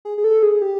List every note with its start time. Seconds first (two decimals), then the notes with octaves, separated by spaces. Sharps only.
0.05 G#4
0.18 G#4
0.24 A4
0.43 G#4
0.62 G4